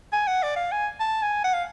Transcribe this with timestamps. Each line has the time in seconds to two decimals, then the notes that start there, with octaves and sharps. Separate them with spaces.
0.13 G#5
0.27 F#5
0.43 D5
0.56 F5
0.72 G#5
1.00 A5
1.22 G#5
1.44 F#5
1.53 F5